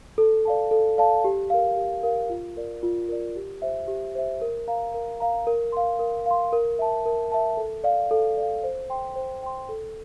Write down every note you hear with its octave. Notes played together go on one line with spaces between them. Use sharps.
A4
D5 F5 A5
A4
D5 F5 A5
G4
A#4 F5
G4
A#4 F5
F4
A#4 D5
F4
A#4 D5
G4
C5 E5
G4
C5 E5
A#4
F5 A#5
A#4
F5 A#5
A#4
F5 C6
A#4
F5 C6
A#4
E5 A5
A#4
E5 A5
A4
D5 F5
A4
D5 F5
C5
G5 C6
C5
G5 C6
A4